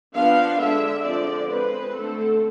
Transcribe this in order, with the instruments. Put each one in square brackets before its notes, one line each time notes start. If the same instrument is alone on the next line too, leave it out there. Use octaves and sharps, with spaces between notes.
[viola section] F3 B3 D4 F5
D3 G#3 D4 E5
D3 F3 G#3 C4 D5
G#3 C4 B4
D3 A3 C4 A4